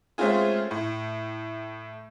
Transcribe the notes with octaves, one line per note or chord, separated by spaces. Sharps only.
G#3 A3 C4 C#4 F4 G#4
A2